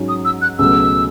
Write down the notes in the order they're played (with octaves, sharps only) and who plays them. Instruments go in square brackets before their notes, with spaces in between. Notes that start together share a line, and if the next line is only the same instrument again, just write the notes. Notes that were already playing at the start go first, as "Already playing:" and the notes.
Already playing: [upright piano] G#2 F#3 C#4
[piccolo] D#6
E6
F#6
[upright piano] C#2 B2 F#3 A3 [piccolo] E6